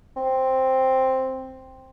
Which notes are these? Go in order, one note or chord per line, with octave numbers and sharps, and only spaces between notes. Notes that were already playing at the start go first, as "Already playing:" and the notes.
C4